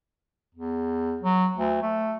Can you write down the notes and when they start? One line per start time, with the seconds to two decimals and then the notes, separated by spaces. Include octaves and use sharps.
0.55 E2
1.21 F#3
1.57 D2
1.82 A3